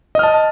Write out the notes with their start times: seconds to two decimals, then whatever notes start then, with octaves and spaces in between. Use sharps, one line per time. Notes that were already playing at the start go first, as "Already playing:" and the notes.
0.15 D#5
0.19 F6
0.23 A5